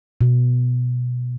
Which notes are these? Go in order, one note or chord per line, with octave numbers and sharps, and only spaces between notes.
B2